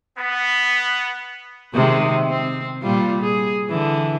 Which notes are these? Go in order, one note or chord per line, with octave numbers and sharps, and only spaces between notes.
B3
C3 D#3 G#3
C4
A#2 G3 F4
G#4
D3 E3